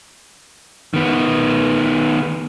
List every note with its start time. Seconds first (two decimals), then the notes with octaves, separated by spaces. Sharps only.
0.94 D#3 B3